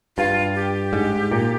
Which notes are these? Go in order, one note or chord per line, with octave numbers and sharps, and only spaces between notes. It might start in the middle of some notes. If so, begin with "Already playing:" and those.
G2 F4
G4
G#2
A#2